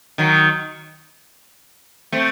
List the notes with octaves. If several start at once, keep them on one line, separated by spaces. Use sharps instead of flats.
D#3 F#3
A3 C4